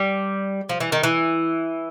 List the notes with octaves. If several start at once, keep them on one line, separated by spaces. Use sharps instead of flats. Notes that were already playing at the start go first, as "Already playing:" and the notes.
Already playing: G3
F3
E3
D#3
E3